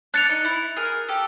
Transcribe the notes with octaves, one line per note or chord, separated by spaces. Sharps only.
D4 F#6 A6 C#7 F7
D#4
E4
G#4 A#4
G4 A4